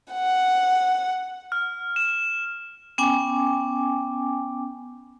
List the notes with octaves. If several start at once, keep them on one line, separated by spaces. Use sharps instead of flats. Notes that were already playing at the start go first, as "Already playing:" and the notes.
F#5
F6
E7
B3 C#4 G5 G#5 D6